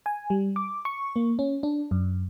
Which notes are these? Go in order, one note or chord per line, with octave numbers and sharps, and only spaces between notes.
G#5
G3
D6
C#6
A#3
C#4
D4
F#2